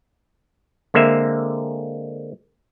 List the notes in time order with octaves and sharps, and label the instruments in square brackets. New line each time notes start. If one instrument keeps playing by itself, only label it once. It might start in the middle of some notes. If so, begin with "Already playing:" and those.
[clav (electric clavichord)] D3 G#3 A#3 C4 E5